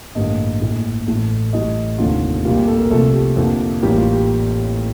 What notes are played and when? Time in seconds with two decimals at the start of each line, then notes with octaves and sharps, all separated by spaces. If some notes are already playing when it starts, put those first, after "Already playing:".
0.15 A1 G2 D3 G3 A#3 D#5
0.61 A#1 A2 A3
1.07 A1 A2 A3
1.53 A1 A2 G3 D#5
1.98 F1 D#2 D3 F3 F4
2.45 A#1 A#2 G3 A#3 F4
2.56 G4
2.68 A4
2.79 A#4
2.91 C2 C3 F3 A3 A4
3.13 G4
3.36 F2 D3 F3 A#3
3.82 A1 A2 G3 A#3 G4
3.98 F4
4.13 G4